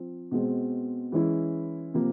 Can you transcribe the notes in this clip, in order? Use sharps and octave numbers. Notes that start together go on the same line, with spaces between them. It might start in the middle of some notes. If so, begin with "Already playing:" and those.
Already playing: F3 C4
B2 G#3 C4
E3 G#3 C#4 E4
C3 F3 A#3